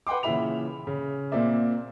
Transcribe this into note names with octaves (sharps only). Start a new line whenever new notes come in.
B4 F#5 G5 C6 D6
A#2 C#3 E3 E5 B5 F7
C#3
A#2 A#3 C4 D5 E5